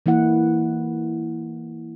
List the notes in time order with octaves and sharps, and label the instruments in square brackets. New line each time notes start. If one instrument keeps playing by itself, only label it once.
[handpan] E3 A#3 E4 F#5